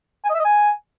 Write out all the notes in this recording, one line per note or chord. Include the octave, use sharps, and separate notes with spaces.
G#5
D#5
E5
D#5
G#5